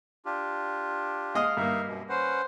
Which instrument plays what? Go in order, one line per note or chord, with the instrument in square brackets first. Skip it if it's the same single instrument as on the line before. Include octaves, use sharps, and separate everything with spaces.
[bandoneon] D4 F4 G4
[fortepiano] G#3 D#5 D#6 [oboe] F5
[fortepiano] G2 A#3 [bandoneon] D#4 E5
[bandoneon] F#2 B2
[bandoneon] C#4 B4 F#5 [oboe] C5